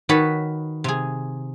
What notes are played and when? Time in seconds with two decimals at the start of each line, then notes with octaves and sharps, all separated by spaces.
0.09 D#3 F#4 B4 C#5 A5 B5
0.84 C3 G#4